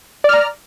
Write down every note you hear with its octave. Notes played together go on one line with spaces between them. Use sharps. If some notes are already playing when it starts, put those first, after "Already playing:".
D5 A#5 F6